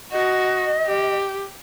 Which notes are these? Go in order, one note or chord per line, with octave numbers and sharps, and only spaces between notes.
F#4 D#5
G4